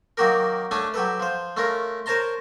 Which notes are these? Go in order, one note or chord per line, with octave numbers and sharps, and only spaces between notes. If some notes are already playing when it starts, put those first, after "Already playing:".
D#3 F#3 A#3 F#4 G4 A#4
A3 C#4 D4 C#5 A5 D#6
F#3 G4 A4 B4
F3 C5
A3 C#4 F4 A#4
A#4 C5 C#5 A5 A#5 C6